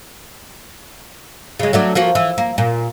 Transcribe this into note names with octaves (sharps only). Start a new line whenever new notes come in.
C#3 G#3
F#3 A3 D4
F3 A#3 F#4
E3
A#3
A#2